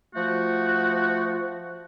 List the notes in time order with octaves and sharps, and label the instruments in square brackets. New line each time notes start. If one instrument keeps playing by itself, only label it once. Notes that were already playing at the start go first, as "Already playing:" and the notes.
[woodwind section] F3 A3 F#4